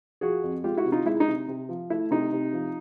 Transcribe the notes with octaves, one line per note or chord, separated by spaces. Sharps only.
F3 F#4 G#4
F2
G#3 F4 G4
E4 F#4
C3
D#4 F4
G#3 E4
D#4
C3
C3
F3
A3 E4
C3 D#4
C3
F3